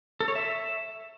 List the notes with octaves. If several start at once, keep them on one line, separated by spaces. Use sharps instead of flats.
A4
C#5
E5